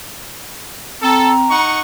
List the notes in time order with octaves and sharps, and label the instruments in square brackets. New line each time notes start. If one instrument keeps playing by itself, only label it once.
[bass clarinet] C4 [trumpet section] A4 [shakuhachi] A#5
[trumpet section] D#4 F#5 C#6